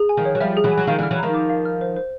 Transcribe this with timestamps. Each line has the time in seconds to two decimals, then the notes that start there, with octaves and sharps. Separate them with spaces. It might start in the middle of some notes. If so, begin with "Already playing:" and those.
Already playing: G#4
0.09 G#5
0.17 D#3 F3
0.25 C#5
0.35 F#3
0.40 F3 G3 E5
0.57 G#4
0.64 E3 F#3
0.71 G#5
0.77 F#3
0.87 D#3 F3 F5
0.98 D3 E3
1.03 F6
1.11 E3 F#3
1.18 D#3 F3 A#5
1.34 D6
1.50 F5
1.65 F6
1.81 C5
1.96 C5